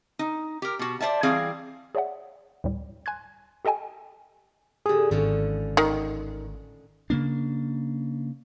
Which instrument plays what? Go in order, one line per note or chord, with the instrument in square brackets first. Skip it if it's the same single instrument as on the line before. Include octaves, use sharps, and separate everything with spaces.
[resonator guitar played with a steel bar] D#4
G4 A#4
B2 F#4
C5 D5 E5 A5
E3 G3 C4 G#4 F5
[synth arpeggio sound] G#4 C#5 D5 E5 F#5
D2 A2 G3
G#5 C6 F#6 G#6
G4 A4 D#5 G5 G#5
[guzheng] A2 D3 [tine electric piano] G4 G#4
[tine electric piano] G#1 [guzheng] D3 F3 C#4
[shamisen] D#3 [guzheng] F#5
[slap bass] C#3 A#3 D4